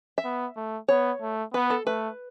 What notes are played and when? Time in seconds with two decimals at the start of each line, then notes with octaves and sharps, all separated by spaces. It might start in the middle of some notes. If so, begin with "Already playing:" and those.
0.18 E5
0.24 B3
0.56 A3
0.88 B3 C#5
1.21 A3
1.53 B3 B4
1.70 A4
1.86 A3 B4